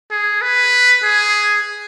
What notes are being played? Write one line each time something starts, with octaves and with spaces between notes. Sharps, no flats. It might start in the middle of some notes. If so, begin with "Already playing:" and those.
G#4
B4
G#4